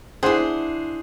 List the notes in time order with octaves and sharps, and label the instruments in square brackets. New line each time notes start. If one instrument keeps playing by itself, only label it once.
[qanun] D4 E4 [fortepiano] G#4 C5 F#5